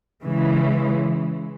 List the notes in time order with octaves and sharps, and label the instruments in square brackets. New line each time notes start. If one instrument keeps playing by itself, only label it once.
[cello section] C#3 E3 G#3